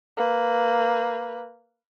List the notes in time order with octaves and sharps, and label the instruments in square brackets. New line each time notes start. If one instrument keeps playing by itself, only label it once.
[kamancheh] A#3 B4